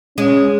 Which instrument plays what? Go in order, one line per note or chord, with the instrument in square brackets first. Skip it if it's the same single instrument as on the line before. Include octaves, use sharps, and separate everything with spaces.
[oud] G#3 [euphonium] C#4